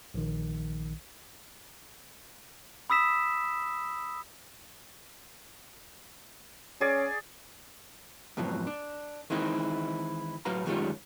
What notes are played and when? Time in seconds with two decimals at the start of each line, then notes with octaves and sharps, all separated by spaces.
0.14 A#1 D#3
2.90 B5 D#6 E6 B6 E7
6.81 C#4 G#4 D5
8.37 F2 G#2 B2 E3 F#3
8.67 D4
9.30 D#3 E3 G#3 C4 D#4 E4
10.45 A2 F#3 B4 F5 A#5
10.66 F#2 D#3 G3 G#3 F4 C#5